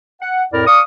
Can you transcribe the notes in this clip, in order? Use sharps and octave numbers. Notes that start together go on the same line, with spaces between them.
F#5
F2 A2 E4 A#4 D5 F6
D5 F5 C#6 D#6